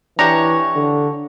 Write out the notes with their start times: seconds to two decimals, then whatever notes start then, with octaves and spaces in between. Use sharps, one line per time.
0.19 E3 D4 G4 C#5 A#5
0.76 D3